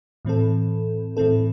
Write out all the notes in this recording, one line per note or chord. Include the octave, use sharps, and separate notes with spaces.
A2 E3 C4 A4
A2 E3 C4 A4